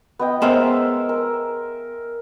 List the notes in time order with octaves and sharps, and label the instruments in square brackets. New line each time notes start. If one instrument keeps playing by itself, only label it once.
[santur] B3 D#5 G5
[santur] G#3 A#4 E5 [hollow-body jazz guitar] B3 C5 C#5
[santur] A#4